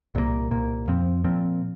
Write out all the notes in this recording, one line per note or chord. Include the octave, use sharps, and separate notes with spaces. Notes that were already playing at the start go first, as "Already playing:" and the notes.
C2 A#2 F3 A#3
C2 A#2 A#3
F2 F3 C4
A#2 F3 C4